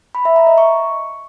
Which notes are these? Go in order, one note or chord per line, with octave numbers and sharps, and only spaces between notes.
B5
E5
A#5
D#5
C#6